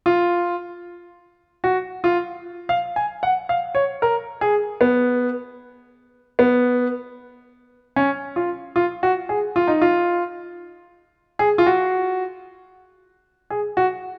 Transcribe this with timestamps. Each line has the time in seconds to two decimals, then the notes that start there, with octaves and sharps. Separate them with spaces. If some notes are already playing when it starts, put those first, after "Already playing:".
0.06 F4
1.64 F#4
2.04 F4
2.69 F5
2.96 G#5
3.23 F#5
3.49 F5
3.75 C#5
4.02 A#4
4.41 G#4
4.81 B3
6.39 B3
7.96 C#4
8.36 F4
8.76 F4
9.03 F#4
9.29 G#4
9.56 F4
9.68 D#4
9.82 F4
11.39 G#4
11.58 F4
11.66 F#4
13.50 G#4
13.77 F#4